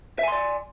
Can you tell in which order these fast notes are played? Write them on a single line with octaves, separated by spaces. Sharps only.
E5 G#5 C6 D5